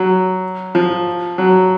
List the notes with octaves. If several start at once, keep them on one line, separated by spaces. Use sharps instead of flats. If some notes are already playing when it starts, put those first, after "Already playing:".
Already playing: F#3
F3
F#3